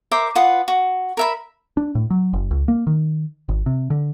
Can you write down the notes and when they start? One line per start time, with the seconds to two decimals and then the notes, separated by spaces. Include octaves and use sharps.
0.11 A#4 C5 E5 D6
0.35 F4 B4 F#5 D#6
0.68 F#4
1.17 A#4 E5 B5
1.77 D4
1.95 A2
2.10 F#3
2.33 F#1
2.51 C#2
2.68 A#3
2.87 D#3
3.49 G#1
3.66 C3
3.90 D3